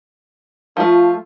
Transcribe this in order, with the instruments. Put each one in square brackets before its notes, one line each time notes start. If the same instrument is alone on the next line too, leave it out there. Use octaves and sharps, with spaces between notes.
[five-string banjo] F3 A3 [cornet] F4